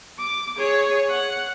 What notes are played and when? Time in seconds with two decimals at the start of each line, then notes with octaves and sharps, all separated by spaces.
0.19 D6
0.57 G#4 C#5
1.09 F#5